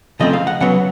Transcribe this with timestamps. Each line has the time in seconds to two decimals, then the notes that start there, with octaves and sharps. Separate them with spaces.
0.20 C#3 F3 A3 C4 D#5
0.33 F5
0.47 F#5
0.60 C#3 F#3 B3 F#5